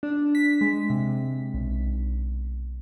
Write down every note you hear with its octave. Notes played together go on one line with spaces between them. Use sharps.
D4
B6
G#3
C3
B1